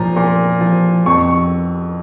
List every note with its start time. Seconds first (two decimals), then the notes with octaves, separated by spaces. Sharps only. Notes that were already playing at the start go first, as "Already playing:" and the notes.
Already playing: A#2 F3 A#5
0.16 A#2
0.61 F3
1.06 F2 C#6
1.28 C#6